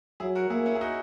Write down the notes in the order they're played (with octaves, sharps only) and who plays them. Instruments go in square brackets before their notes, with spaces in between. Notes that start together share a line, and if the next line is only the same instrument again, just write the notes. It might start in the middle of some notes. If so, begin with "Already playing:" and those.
[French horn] F#3 [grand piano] E4 G#4
[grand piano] F#4 A#4
[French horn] A#3 [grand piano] E4 G#4
[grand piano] C#4 E4
G#4
D#4 F#4